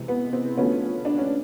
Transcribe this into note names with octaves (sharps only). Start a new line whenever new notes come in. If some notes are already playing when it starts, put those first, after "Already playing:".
Already playing: C3 E3 G#3
B3
C4
D3 F3 A3 B3 C#4
D4
C#4